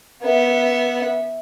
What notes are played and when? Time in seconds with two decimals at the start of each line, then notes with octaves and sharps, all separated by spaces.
0.22 B3 E5